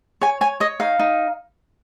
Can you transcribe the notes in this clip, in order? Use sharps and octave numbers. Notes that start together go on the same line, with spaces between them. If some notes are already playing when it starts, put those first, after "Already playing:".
C#5 G#5
C#5 G#5
C#5 D#5
D#4 F5
D#4